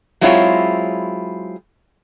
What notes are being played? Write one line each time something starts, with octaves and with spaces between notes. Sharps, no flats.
F#3 G#3 C4 E4 F4 C#5